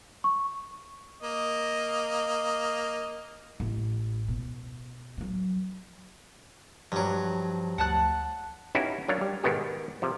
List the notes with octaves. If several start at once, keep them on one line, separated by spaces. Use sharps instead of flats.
C#6
A#3 D#5
A1
B2
E3 F#3
G2 F3 F#3
D2 F#5 A5 F#6
B3 C#4 D#4 E4 F#4 G4
F#3 D4 A#4 C#5 F5
G3
G#2 B2 D#3 B3 G4
C3 F3